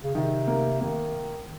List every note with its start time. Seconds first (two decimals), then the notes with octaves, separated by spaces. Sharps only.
0.03 C#3
0.15 C3 D#3
0.47 A#3
0.81 D#3 A#3